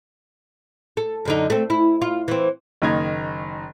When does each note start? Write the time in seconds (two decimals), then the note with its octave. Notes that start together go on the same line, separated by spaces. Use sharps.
0.97 A4
1.25 F#2 D3 D#4
1.50 A3 C4
1.70 E4
2.02 F4
2.28 E3 C4
2.82 F#1 D#3 D#4 A#5 G#6